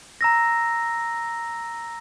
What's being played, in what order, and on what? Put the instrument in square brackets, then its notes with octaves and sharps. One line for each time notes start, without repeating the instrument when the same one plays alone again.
[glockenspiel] A#5 E6 A#6